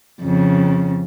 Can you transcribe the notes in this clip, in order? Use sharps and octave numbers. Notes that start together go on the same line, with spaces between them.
F2 C#3